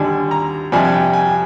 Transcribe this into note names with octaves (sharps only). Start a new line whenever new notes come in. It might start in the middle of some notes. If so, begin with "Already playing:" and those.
Already playing: D#2 D3 G3 D4 G#5
A#5
F2 C3 G3 D4 G#5
G#5
G5
G#5